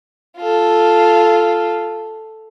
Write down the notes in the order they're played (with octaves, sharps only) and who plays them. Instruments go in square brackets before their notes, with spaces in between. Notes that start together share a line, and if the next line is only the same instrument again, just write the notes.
[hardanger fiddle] F4 A4